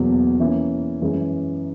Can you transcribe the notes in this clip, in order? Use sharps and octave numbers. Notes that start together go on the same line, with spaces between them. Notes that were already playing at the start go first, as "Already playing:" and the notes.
Already playing: E2 B2 F#3 A#3
E3 A#3 C#4 E4
F#2 E3 G#3 C#4